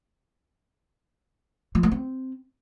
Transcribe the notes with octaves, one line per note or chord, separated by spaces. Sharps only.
F3
A3
C4